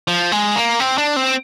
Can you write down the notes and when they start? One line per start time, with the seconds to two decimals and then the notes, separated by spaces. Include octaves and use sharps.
0.08 F3
0.32 G#3
0.56 A#3
0.80 C4
0.98 D4
1.16 C4